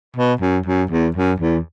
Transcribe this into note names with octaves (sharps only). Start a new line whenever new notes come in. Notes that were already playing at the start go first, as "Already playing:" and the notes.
B2
F#2
F#2
E2
F#2
E2